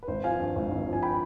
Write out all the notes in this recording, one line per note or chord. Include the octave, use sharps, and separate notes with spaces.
B4
G#1 C5
F3 F5 G#5
G2
G#1
G#1
F3
G#5
G5 B5